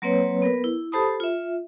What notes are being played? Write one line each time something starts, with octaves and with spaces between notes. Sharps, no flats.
F#3 A#3 C4 B4 C#5
B3 A#4 B4
E4
G4 A4 C5 A5 B5 D#6
F4 E5